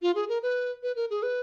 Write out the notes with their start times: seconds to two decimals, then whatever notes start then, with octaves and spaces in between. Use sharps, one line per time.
0.02 F4
0.15 G#4
0.29 A#4
0.43 B4
0.83 B4
0.96 A#4
1.10 G#4
1.23 B4